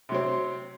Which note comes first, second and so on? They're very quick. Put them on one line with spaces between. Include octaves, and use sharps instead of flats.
C3 F#3 C4